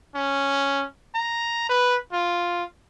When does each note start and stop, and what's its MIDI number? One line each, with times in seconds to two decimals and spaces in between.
0.15 0.85 61
1.15 1.66 82
1.69 1.97 71
2.13 2.64 65